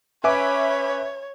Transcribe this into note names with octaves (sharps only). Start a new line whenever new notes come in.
C#4 B4 C#5 E5 G#5 B5 D6